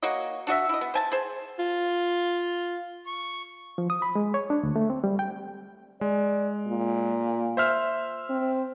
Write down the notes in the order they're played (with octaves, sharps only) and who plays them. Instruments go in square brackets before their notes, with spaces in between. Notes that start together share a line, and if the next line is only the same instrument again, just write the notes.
[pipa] A#3 F#4 C#5 D#5
D4 F#4 D#5 E5
E4 D#5
B3
C5 G#5 A5
G#4 C5
[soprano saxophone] F4
C#6
[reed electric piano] F3
D#6
B5
G#3
C#5
D4
D2
A3
C4
G3
G5
[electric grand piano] G#3 [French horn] D5
[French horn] A#2
[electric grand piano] C5 E5 F6
[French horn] C4